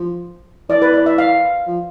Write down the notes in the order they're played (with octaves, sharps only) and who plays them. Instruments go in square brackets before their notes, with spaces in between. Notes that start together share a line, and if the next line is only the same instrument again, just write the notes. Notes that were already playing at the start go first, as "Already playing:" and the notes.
Already playing: [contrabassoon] F3
[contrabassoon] E3 [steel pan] D5
[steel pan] B4
D5
E5
F5
[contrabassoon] F3